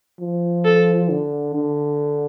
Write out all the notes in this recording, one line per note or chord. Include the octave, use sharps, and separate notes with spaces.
F3
A4
D3
D3